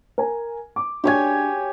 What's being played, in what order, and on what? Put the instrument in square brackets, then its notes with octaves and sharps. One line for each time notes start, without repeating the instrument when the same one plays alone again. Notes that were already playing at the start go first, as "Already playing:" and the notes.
[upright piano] A#4 G#5
D6
[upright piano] D4 C#6 G#6 [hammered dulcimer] G4 C#5 G#5